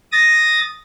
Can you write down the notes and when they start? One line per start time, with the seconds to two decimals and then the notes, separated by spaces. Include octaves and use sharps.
0.12 D#6 A6 A#6